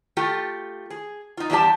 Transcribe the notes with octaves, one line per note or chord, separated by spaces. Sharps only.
A3 F4 G4
G#4
D#4 F4
E2 G3 D4 F4 G4 A5